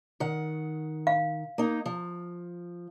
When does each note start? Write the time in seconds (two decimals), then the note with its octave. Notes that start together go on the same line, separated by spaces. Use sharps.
0.20 D#3 F#5
1.07 F5
1.58 A#3 D#4
1.86 F3